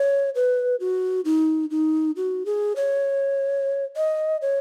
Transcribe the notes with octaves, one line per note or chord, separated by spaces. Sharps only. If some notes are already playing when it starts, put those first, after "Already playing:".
Already playing: C#5
B4
F#4
D#4
D#4
F#4
G#4
C#5
D#5
C#5